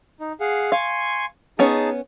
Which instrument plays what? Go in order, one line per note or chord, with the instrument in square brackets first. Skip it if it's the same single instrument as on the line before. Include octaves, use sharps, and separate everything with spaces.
[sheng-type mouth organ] D#4
G#4 F5 F#5
[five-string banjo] F5 [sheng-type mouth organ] G#5 C6 C#6
[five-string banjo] B3 C#4 C#5 [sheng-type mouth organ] D#4 G#4 A5